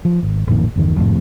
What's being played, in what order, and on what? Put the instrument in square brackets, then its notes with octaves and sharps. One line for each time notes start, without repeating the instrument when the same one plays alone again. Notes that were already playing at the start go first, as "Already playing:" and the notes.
[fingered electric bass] F3
G#1
A1 F2 A#2 D#3
G1 E2 D#3
G#1 F2 A2 C3